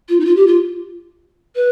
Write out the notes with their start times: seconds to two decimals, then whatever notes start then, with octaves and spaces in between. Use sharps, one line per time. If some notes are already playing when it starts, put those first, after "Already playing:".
0.09 F4
0.20 D#4
0.25 F4
0.36 G4
0.47 F4
1.56 B4